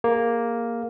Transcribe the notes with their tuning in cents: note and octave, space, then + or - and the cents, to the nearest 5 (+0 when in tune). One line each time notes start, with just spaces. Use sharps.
A#3 +0 G#4 +0